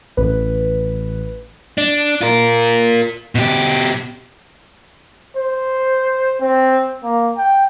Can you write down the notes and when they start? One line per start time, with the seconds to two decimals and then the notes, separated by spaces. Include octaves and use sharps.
0.17 A1 B4
1.78 D4
2.21 F4 A#4
3.35 B2 G4
5.37 C5
6.41 C4
7.03 A#3
7.37 G5